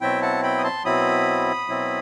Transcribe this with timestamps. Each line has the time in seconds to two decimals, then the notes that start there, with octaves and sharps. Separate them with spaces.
0.01 B2 F#3 C4 E4 E5 G5
0.22 F#5 A5
0.43 G5 B5
0.58 D#6
0.64 A5 C6
0.85 B2 F#3 C4 E4 B5 D#6
1.68 B2 F#3 C4 E4